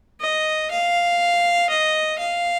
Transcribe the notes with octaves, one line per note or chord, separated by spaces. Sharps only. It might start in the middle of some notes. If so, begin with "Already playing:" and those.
D#5
F5
D#5
F5